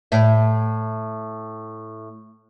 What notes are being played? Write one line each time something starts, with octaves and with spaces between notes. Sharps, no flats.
A2 E5